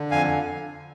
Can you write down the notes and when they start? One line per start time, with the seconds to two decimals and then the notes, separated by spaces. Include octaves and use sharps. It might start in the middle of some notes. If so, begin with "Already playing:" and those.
Already playing: D3
0.11 F2 F5 G#5